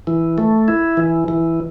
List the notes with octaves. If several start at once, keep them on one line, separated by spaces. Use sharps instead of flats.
E3
A3
E4
E3
E3